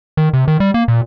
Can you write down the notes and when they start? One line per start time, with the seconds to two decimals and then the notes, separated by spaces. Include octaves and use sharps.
0.17 D#3
0.33 C3
0.48 D#3
0.60 G3
0.74 A#3
0.88 A#2